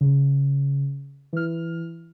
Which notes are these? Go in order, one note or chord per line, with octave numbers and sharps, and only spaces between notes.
C#3
E3 F6